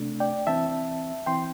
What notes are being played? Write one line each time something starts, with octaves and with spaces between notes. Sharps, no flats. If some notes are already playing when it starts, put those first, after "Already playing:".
Already playing: C3 A3 D4
D5 G5
E3 C4 E5 A5
E3 C4 G5 C6